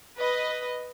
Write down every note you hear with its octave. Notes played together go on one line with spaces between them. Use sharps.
B4 D#5